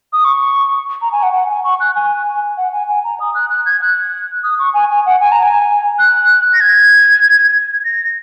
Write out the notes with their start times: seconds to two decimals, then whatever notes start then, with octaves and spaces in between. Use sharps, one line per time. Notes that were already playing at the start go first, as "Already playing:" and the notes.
0.13 D#6
0.25 C#6
1.02 A#5
1.12 G#5
1.23 F#5
1.33 F#5
1.49 G#5
1.64 C#6
1.80 F#6
1.96 G#5
2.58 F#5
2.72 G#5
2.88 G#5
3.04 A#5
3.20 D#6
3.35 F#6
3.50 F#6
3.66 G#6
3.81 F#6
4.43 D#6
4.59 C#6
4.74 G#5
4.90 G#5
5.06 F#5
5.21 G#5
5.32 A#5
5.43 G#5
5.99 F#6
6.54 A#6
6.61 G#6
7.85 A#6